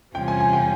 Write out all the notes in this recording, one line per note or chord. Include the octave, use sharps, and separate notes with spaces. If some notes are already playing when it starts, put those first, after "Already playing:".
E2 C3 G3 C#4 F4 G5
G#5
G#5
G5